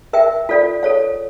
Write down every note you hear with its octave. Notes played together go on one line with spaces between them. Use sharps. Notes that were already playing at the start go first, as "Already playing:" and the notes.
A#4 E5 G5
F4 A4 D5 F5
A4 C#5 F5